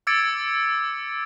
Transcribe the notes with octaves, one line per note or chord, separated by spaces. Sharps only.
D6 E6 G#6 A6 C#7 D7